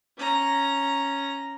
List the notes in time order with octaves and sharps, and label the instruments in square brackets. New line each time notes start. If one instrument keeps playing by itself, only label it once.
[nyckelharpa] C#4 A#5